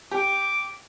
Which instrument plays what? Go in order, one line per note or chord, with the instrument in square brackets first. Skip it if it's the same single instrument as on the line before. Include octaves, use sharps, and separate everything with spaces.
[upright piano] G4 [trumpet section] D6